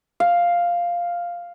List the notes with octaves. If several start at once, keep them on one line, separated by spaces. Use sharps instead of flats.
F5